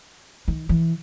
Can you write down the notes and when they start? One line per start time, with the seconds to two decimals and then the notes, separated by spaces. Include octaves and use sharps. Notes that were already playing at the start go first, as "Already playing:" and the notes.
0.48 D#3
0.69 E3